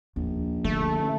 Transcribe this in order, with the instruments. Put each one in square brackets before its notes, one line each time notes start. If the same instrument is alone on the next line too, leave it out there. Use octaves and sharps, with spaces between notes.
[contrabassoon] A#1 [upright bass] D#2
[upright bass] D3 D#3 [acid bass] A3
[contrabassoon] A1